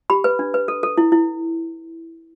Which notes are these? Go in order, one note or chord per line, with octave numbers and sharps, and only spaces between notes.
G4 B5
B4
D4
B4
A4
A4
E4
E4